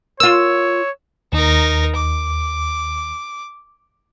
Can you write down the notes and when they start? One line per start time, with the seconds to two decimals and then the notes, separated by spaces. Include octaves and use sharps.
0.20 F4 A#4 C#5 E6
1.32 D#2 D#4 A#4
1.96 D6